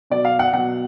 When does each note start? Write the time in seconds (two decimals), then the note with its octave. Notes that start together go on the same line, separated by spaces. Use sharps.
0.10 B2 F#3 D5
0.25 F5
0.39 F#5
0.53 B2 F#3 F#5